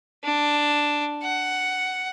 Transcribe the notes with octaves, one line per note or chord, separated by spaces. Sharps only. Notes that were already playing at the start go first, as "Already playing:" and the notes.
D4
F#5